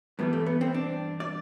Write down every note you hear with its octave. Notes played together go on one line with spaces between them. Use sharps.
G2 E3 G3 B3
A3
B3
C4
D4
D5